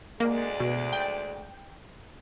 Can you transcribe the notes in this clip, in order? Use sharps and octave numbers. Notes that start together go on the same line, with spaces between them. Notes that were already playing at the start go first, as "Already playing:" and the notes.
D2 G#3 A#3 D5
B2
G5